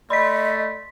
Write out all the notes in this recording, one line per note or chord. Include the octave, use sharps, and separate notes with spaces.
A3 D5 D#5 B5 C6 B6